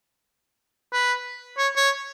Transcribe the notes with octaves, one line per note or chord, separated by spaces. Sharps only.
B4
C#5
C#5